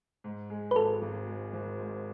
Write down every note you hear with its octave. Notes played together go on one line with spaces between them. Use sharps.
G#2
G#3
B4
G#1 A4
G#1
G#3
G#1
G#2